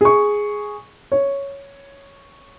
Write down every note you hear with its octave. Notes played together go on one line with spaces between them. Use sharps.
G#4 C#6
C#5